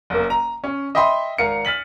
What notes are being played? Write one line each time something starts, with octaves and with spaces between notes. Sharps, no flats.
F#1 A#3
A#5
C#4
D#5 E5 G5 B5 C6
G#1 A#4 F5 C#7
F6 A6 B6 F#7